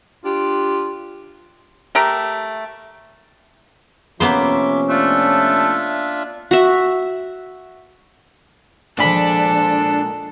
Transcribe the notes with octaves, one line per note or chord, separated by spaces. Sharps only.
D4 F4 G4
A3 G4 A#4
C3 F3 A#3 B3 C#4 C5 E5 D6
A3 D4 F4 E5
F#4 E5
A#2 F3 G#3 D4 A4 B5